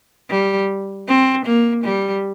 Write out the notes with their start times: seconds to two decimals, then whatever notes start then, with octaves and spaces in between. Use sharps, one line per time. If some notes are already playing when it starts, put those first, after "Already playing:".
0.30 G3
1.07 C4
1.46 A#3
1.84 G3